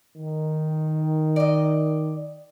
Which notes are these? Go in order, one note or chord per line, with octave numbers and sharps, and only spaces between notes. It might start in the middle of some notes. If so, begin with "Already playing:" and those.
D#3
D5 D#5